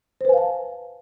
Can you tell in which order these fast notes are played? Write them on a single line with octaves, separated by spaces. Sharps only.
C5 B4 G#5 F5 A5